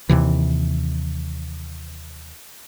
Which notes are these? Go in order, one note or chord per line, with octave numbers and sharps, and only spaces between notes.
D#2 C3 E3